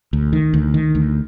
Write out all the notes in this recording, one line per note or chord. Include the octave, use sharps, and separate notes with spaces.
D2
D#3
D2
D#3
D2